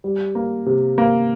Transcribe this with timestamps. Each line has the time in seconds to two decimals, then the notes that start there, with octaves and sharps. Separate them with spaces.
0.04 G3
0.35 A#3
0.66 C3
0.98 A#3